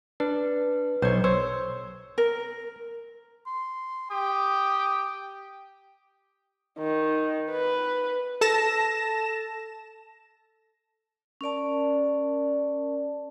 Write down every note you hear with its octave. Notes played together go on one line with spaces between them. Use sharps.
D4 B4
B1 C5 C#5
C5 C#5 E6
A#4
C6
G4 G5 D#6
D#3
B4
A4 A5 A#6 E7
C#4 A#4 D5 A5